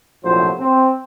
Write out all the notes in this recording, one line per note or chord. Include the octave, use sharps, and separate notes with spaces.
A#1 A2 C3 F3 F#3 C5
C4